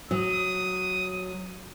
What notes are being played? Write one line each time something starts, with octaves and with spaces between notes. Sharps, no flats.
F#3 D#6